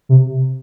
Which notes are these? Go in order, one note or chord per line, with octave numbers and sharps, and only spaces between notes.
C3